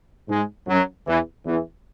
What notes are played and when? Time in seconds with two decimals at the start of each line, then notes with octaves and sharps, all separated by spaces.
0.28 G#2 G#3
0.68 F#2 F#3
1.07 E2 E3
1.46 E2 E3